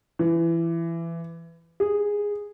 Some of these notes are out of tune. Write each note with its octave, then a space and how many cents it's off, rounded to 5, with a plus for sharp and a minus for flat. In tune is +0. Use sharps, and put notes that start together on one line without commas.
E3 +20
G#4 -10